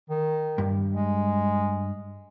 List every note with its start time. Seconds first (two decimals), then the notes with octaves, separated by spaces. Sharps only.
0.10 D#3
0.58 G2
0.94 G#3